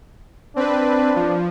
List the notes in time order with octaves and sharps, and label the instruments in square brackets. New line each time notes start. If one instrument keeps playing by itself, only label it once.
[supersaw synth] C4 B4 [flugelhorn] D4
[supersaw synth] F3